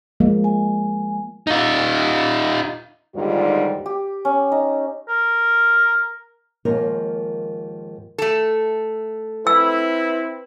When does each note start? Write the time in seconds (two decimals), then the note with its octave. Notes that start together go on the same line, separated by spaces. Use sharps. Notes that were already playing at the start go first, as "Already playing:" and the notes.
0.20 F3 G#3 A#3
0.44 G#5
1.47 D#4 F4
3.15 D#2 G#2 D3 G3 D#4 F4
3.86 G4
4.25 C#4
4.52 D#4
5.09 A#4
6.65 D#2 G#2 F3 A#3 C#4 A#4
8.18 A3 A4
9.47 C4 E4 B4 E6